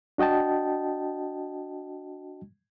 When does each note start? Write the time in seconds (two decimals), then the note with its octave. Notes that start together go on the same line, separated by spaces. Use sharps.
0.18 D4 F#4 D#5 G5 A5